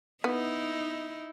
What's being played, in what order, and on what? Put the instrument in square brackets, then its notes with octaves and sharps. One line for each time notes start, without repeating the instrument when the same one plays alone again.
[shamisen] B3 [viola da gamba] D#4 E4